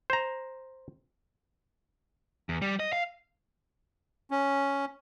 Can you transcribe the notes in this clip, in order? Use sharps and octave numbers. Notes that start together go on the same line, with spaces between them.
C5 A#5
E2
G3
D#5
F5
C#4